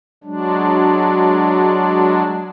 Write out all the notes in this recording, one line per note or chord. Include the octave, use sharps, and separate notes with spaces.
F#3 G#3 D4